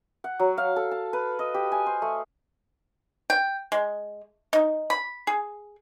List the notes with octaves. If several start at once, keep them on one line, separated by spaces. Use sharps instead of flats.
F#5
F#3
F5
A4
A5
B4
D#5
G4
G#5
C5
A3
G5
G#3
D#4
B5
G#4